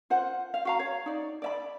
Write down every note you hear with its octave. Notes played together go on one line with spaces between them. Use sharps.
F4 C5 F#5
F5
F#4 F5 A#5
C#5
D#4 D5
D5 E5 B5